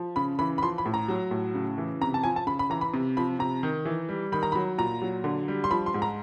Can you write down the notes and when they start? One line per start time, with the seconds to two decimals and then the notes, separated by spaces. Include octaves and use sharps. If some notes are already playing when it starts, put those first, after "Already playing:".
Already playing: F3
0.16 C#3 B5
0.39 E3 B5
0.58 B5
0.62 F3 C6
0.78 B5
0.86 A2
0.94 A#5
1.08 F#3
1.31 A2
1.55 C#3
1.78 E3
2.01 C3 A#5
2.14 A5
2.24 F3 G#5
2.36 A5
2.47 C#3 B5
2.59 B5
2.70 E3 A#5
2.81 B5
2.94 C3
3.17 F3 B5
3.39 C3 A#5
3.63 D#3
3.85 E3
4.09 G3
4.32 D#3 B5
4.43 A#5
4.52 B5
4.55 F#3
4.78 A#2 A#5
5.02 F#3
5.24 D3
5.48 G3
5.64 C6
5.71 F3 B5
5.86 C6
5.94 G#2
6.02 A#5